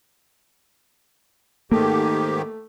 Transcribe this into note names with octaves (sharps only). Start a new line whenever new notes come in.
G#2 D#3 A3 A#3 G4